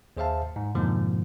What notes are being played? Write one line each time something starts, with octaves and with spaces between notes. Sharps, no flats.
D#2 G#4 C5 E5 F5 A5
G#2
F2 G#2 B2 D3 F3 A#3